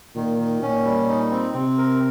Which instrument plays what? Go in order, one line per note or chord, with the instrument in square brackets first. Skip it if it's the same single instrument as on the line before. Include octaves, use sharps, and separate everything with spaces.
[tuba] A#2 [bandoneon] D#3
[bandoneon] D#3
[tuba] A#2 [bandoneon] C#4
[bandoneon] G3
D#4
C4
[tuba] C3 [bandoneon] C4
[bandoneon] A#4